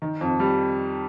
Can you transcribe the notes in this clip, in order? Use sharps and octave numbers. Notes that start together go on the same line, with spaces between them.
D#3
F2
G3